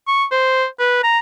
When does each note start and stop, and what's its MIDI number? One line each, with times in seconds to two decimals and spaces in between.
0.07 0.25 85
0.31 0.65 72
0.79 1.02 71
1.03 1.19 82